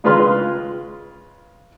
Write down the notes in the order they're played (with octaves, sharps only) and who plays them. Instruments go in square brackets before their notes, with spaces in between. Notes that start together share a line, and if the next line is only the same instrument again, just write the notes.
[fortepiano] C#3 G#3 F4 B4 C6 F6